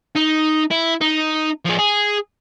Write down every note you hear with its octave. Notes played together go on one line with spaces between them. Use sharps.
D#4
E4
D#4
F3 G#4
G#4